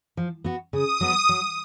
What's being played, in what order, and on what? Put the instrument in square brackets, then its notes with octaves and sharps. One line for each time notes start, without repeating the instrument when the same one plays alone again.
[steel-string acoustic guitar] F3
B3 F#4
[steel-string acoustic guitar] C#3 [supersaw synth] D#6
[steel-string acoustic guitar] F#3 B3
F#3